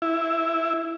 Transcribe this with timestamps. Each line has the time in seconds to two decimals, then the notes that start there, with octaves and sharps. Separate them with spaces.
0.02 E4